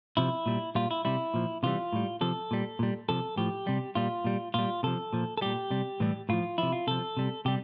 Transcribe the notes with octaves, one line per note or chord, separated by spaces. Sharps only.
C3 F3 E4
A#2 G3
A#2 G3 F4
E4
C3 G3 E4
A#2 F3
C3 E3 G3 F4
A2 G3
C3 F3 A4
A#2 G3
A#2 G3
C3 F3 A4
A2 F3 G4
C3 G3
A#2 G3 F4
A#2 G3
A#2 G3 F4
C3 F3 A4
A#2 F3
A4
A#2 G3 G4
C3 G3
A2 E3 G3
A2 F3 F4
C3 F3 E4
F4
C3 F3 A4
C3 G3
C3 G3 G4